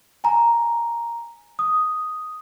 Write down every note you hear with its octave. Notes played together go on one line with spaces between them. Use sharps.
G#5 A#5
D#6